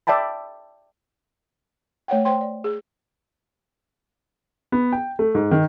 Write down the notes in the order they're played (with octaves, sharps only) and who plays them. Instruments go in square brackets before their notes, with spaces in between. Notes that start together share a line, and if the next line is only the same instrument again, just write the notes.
[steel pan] D5 E5 G5 A5 B5
[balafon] A3 C#5 F#5 G5
C5 G5 C6
D5
G#4
[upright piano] B3
G5
A3
G#2
D#3